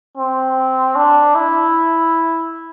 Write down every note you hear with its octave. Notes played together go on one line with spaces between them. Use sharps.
C4
D4
E4